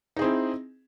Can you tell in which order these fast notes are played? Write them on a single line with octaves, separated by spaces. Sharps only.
D#4 G#4 C4 E4